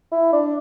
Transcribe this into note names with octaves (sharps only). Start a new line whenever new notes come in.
E4
D4